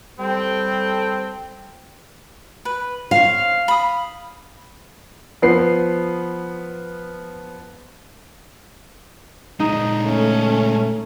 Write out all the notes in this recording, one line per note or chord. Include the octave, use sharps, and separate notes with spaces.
G3 C4 A4 G5
B4
C5 C#5 F5
B5 D#6
F3 B3 C7
A#2 G#3 D#4
A3 C#4